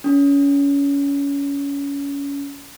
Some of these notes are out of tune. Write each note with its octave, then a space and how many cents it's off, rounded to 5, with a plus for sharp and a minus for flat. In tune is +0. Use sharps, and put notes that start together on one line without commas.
C#4 +25